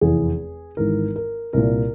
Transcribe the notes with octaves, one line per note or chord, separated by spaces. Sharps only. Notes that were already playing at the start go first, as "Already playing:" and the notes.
F1 E2 E3 G#4
G#1 G#2 E3 A#4
A#4
C2 A#2 A#4